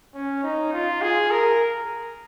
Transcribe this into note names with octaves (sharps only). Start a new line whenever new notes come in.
C#4
D#4
F4
G#4
A#4